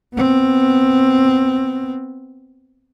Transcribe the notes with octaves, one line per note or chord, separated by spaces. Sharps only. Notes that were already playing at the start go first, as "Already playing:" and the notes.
B3 C4